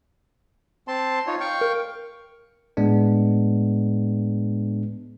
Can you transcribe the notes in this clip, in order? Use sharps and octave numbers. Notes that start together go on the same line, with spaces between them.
C4 A5 C6
D#4 F4 C#5
F5 G5 C#6
A#4
A2 G#3 B3 D4